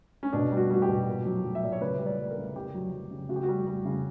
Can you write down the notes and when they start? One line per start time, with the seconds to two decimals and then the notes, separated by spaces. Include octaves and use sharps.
0.23 C#4
0.33 B2 D4
0.52 G3
0.57 F#4
0.70 G3 F#4
0.82 G4
0.88 B2
1.07 A#2
1.26 F#3
1.44 F#3
1.55 E5
1.63 A#2 D5
1.72 C#5
1.81 C#3 B4
1.99 G3
2.06 D5
2.18 G3
2.30 A#4
2.37 C#3
2.55 C#3 G4
2.74 F#3
2.92 F#3
3.11 C#3
3.29 C#3 F#4
3.36 G4
3.43 F#4
3.49 G3
3.67 G3
3.85 C#3